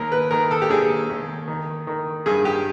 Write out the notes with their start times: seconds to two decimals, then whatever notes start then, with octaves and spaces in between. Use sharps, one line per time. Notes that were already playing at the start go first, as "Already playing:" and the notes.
Already playing: D#2 A#4
0.12 B4
0.31 D#3 A#4
0.51 A4
0.62 G4
0.70 D#2 G#4
1.09 D#2
1.48 D#3
1.87 D#3
2.26 G2 G#4
2.45 G4